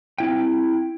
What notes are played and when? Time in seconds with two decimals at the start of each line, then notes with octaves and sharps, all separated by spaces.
0.18 C4 E4 G5